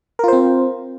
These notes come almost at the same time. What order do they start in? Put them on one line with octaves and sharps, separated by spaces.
A#4 F4 C5 C4